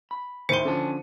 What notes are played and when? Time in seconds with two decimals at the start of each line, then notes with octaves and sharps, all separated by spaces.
0.11 B5
0.49 D2 A2 D#3 C5 C6 C#7 D#7
0.65 D3 F3 C#4 G#5 A5